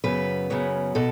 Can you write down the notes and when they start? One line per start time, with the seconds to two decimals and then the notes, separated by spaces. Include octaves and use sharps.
0.04 F#2 C#3 F#3 B3 B4
0.50 F#2 C#3 F#3 B3
0.95 B2 A4